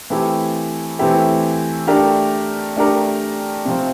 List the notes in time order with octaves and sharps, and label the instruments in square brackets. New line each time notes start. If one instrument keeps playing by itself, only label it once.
[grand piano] E3 A3 C4 E4 G4
E3 A3 C4 E4 G4
A3 D4 G4 A#4
A3 D4 G4 A#4
C3 F3 C4